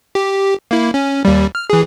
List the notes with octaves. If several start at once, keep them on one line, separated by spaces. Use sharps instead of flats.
G4
A#3 E4
C#4
D#2 G3
F6
E3 G#4